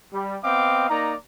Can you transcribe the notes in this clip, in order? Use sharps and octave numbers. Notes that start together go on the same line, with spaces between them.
G3
B3 C4 D#5 F5 G5 D6
A#3 D#4 D5 A#5